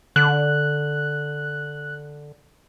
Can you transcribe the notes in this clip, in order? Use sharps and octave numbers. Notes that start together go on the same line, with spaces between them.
D3 F#6